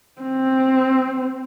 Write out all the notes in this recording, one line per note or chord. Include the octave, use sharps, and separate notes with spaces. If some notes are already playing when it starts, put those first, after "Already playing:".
C4